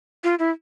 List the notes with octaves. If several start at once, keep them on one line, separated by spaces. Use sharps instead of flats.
F4
E4